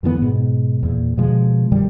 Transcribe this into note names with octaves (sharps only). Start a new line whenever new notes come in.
F#2 D3 E3 B3
G#2 B2
E2 A#2
B2 D3 F3 G#3
F#2 D3 G3